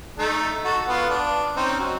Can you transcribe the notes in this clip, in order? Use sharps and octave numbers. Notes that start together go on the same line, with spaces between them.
A3 D#4 A4
F#4 A4
B3 F4 F#5
D4
C4 C#4 D#4
F#3